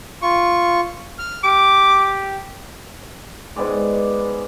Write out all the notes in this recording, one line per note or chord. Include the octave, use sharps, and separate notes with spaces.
F4 C#6
F6
G4 D6
G#2 B3 G#4 D5